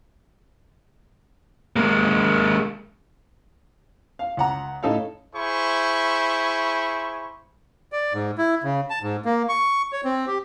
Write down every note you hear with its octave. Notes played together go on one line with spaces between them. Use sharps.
G#3 A#3
F5
C#2 F#5 A#5
A2 C#3 D#4 A4 C#5 F5
E4 G#4 C5 B5 C#6
D5
G#2
E4
C#3
A5
G#2
A#3
C#6
C#5
C4
G4